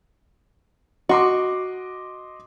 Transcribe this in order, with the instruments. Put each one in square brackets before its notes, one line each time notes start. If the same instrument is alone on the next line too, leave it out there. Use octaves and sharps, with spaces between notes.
[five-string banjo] F#4 [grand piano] D#5 C6 D6